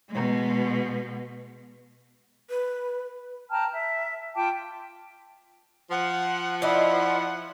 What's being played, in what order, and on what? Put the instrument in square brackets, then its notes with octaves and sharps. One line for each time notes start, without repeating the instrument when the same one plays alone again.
[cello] B2 G#3
[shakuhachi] B4
[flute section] G5 A5 A#5 F6
E5
F4 G5 A5 D6
[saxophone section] F3 [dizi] F#5
[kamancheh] E4 [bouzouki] D5 D#5 [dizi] F#5